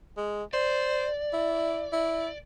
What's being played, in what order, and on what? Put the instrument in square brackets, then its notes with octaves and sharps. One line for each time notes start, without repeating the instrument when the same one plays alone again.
[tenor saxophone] G#3
[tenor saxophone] C5 [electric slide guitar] D5
[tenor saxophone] E4
E4